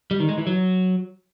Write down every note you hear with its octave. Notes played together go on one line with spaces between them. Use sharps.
G3
D#3
G#3
E3
F#3